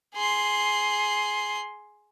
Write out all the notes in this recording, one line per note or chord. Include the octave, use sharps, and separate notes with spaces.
G#4 C6